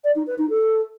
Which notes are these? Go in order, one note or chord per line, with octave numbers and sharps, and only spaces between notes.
D5
D#4
B4
D#4
A4